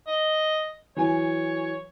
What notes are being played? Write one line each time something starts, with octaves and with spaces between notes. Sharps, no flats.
D#5
E3 F#3 C#5 G#5